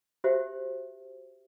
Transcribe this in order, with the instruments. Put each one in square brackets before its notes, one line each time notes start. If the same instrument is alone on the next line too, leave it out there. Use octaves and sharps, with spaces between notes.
[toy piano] F#4 G4 C5 E5